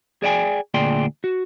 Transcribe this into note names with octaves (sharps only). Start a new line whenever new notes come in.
G#4 D5 D#5 G5 G#5
D2 A#2 G#4 D5 G5 C6
F#4